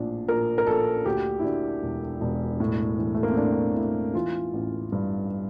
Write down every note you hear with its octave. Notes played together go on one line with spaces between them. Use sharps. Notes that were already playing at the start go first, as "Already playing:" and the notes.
Already playing: A#1 A2 D4
A#1 A#4
A#4
A#1 A4
D2 G4
E4
D2 D4
E1
E1
A2
E3
A3
A#3
C4
A2 D4
A2 E4
E3 F4
A1
G2